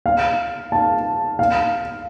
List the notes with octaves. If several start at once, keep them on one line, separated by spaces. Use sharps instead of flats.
F5
A5
F5